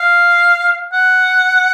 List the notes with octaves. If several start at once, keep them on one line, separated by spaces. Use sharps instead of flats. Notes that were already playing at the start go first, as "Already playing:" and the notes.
Already playing: F5
F#5